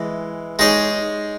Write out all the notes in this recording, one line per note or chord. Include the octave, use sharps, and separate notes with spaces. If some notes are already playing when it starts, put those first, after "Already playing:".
Already playing: E3 G#3
G#3 D#4 G#4 C#5